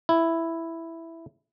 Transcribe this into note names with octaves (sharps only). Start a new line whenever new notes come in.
E4